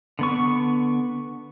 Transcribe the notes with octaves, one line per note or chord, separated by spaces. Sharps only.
D3 B3 C#6